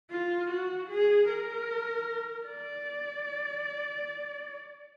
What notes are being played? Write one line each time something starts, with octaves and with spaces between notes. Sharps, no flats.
F4
F#4
G#4
A#4
D5